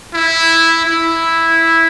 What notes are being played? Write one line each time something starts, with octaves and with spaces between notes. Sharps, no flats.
E4
E4